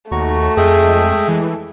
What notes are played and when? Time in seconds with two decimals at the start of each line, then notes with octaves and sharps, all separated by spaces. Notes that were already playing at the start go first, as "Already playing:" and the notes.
0.12 D#2 A3 F#4 A#5 C#6
0.57 F2 G#3 E5 G5 D#6
1.28 E3